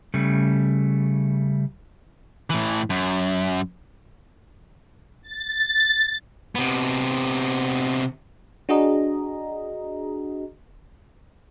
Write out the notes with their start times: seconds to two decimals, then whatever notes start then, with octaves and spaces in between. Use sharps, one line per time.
0.14 C#3 G3 A3
2.50 A2 E3
2.90 F#2
5.23 A6
6.55 C3 B3
8.69 D4 F#4 G#4 D#5 A#5